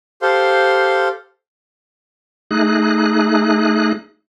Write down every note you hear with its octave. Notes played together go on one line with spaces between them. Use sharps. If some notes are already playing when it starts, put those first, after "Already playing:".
G4 A4 C5 F5 C6
A3 D#4 G#4 F#6